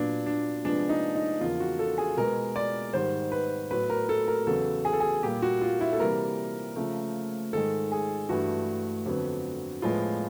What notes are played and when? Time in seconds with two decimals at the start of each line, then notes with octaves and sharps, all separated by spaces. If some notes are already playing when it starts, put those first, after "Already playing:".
Already playing: A#2 F#3 B3 D4
0.26 D4
0.64 C3 F3 G#3 B3 D4
0.89 D#4
1.16 D#4
1.41 E2 C#3 F3 A#3 F4
1.60 F#4
1.79 A4
1.98 G#4
2.17 B2 G#3 B3 A#4
2.56 D5
2.93 G#2 D#3 G3 C5
3.32 B4
3.71 A2 F#3 B3 B4
3.90 A#4
4.09 A4
4.28 A#4
4.47 E2 C#3 F#3 B3 A4
4.85 G#4
4.93 A4
5.00 G#4
5.23 A#2 G3 A#3 G4
5.42 F#4
5.62 F4
5.81 E4
5.93 A4
6.00 C3 E3 G3 A#3 A#4
6.76 C#3 F3 A3
7.53 G#2 D#3 G#3 A4
7.92 G#4
8.29 G2 E3 A3 F#4
9.06 F2 D3 F#3 B3
9.82 A2 F3 G#3 B3 F4